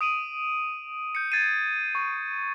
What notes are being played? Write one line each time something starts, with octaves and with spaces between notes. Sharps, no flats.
D#6 D7 D#7 F#7
G6 C#7
G#6 A6 C7 C#7 D#7
C#6